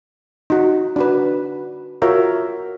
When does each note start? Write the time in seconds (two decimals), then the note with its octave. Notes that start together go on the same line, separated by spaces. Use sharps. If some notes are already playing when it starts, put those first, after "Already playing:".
0.50 D#4 F#4
0.96 D4 F#4 B4
2.02 F4 F#4 A#4 C#5 E5